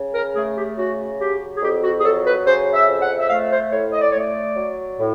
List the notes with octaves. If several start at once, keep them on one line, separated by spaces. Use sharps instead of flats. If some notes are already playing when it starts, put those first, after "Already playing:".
Already playing: C#3
A#4
A3 G#4
G4
C#3 F#4
F#3 G4
G#4
F2 G4
F#4
G#4
F#3 A4
B4
C#3 C5
E5
F2
F#5
E5
A3 F5
C5
A2 C#5
D#5
D5
A3 C#5
D5
F#3
A2